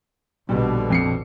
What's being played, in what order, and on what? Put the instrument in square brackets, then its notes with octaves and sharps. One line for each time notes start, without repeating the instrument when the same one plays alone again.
[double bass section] A#1 B2 D3 [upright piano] G3
[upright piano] F2 C7 C#7